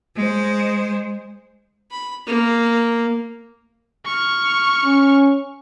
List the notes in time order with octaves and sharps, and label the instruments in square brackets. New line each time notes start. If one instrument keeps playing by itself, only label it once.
[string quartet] G#3 C5
[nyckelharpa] B5
A#3
[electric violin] C#6 F6
[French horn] C#4